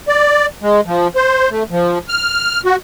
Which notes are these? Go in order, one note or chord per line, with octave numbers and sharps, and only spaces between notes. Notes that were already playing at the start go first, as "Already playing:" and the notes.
D5
G#3
F3
C5
A3
F3
F6
F#4